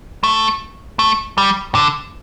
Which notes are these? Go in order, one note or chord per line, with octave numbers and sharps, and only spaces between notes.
A3
A3
G3
D3